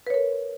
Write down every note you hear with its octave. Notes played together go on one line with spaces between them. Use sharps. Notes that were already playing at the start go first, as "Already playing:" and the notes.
A#4 B4 C#5